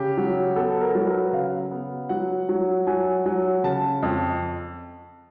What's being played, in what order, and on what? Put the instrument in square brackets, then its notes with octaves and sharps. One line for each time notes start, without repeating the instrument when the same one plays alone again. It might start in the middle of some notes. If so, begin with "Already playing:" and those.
Already playing: [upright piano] C#3 G4
F#3
B3 A4
A#4
A4
F#3 A#4
B4
C#3 F5
B3
F#3 F#5
F#3
F#3 G#5
F#3
C#3 A5
F2